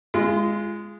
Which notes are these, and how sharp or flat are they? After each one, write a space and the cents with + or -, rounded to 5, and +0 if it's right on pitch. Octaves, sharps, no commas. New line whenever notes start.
G#3 +0 F4 -30